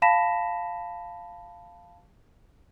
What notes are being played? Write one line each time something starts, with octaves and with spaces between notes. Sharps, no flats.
F5 A5 B5 A#6 B6 E7